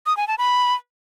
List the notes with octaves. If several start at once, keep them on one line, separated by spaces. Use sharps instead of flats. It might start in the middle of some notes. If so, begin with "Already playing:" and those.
D#6
G#5
A5
B5